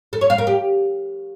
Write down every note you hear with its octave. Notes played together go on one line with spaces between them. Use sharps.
A4
C#5
F5
A#4
G4